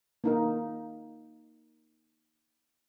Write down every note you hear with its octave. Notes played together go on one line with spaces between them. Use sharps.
A#3 D#4 A#4